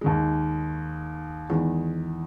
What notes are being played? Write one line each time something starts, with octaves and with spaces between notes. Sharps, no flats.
D#2 D#3 G#3
E2 D#3 G#3